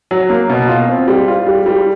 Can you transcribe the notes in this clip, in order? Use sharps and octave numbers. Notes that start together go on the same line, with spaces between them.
F#3
A#3
B2
F4
C4
G3
F4
G3
G3